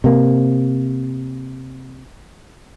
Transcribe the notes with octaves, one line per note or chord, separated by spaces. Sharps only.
C3 A#3